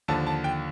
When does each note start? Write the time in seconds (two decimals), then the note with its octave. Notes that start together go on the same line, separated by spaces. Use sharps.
0.08 D#2 D3 F3 A5
0.27 A5
0.44 G5